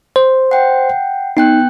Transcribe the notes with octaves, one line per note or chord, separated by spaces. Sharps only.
C5
F#5 G5
B3 D#4 G5 F#6